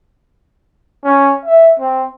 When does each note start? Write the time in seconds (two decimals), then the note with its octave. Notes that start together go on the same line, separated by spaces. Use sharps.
1.04 C#4
1.45 E5
1.80 C4